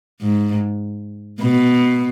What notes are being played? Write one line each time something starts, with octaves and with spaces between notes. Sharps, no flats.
G#2
B2